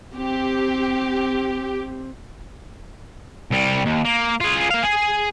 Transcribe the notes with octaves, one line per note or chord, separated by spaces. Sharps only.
C4 G4
C2 G3
D#2
A#3
F4 G#4
A#3 F5
G#4